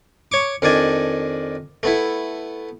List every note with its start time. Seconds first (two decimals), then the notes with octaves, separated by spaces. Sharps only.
0.32 C#5 C#6 D6
0.62 F2 D#3 D4 D5 G#5
1.83 A3 B3 E4